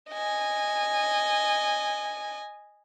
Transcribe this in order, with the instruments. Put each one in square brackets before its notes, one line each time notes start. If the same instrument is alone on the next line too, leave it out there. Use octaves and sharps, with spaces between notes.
[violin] D#5 G#5